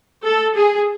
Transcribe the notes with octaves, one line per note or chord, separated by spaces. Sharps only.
A4
G#4